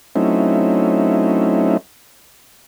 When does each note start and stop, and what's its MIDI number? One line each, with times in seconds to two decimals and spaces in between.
0.16 1.77 54
0.16 1.77 57
0.16 1.77 60
0.16 1.77 61
0.16 1.77 63
0.16 1.77 64